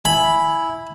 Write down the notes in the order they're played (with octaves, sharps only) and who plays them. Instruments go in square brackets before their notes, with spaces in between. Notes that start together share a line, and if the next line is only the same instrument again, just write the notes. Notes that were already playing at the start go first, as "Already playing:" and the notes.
[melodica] E4 [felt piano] G#5 [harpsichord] B5